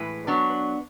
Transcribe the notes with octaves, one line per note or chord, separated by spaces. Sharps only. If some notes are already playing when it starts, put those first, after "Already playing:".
Already playing: A2 E3 G#3 B4
F#3 B3 D4